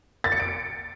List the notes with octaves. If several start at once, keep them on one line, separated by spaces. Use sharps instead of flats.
A6
C#7
D7